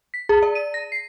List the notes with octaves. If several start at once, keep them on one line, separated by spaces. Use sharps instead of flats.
B6
G#4
D5
D#7
A#6
C7